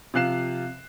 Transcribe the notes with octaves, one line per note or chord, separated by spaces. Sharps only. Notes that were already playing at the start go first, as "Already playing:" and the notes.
C3 F3 F5 F#6 C7 E7